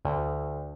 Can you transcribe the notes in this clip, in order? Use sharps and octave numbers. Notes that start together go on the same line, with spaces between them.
D2